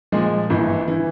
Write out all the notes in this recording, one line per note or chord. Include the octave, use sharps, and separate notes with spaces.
A#2 F3 G#3
G#1 G2 E3
E3